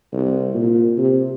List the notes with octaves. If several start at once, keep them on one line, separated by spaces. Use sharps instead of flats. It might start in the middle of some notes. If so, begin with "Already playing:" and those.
C2
A#2
C3